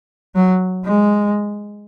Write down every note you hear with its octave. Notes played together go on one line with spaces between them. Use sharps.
F#3
G#3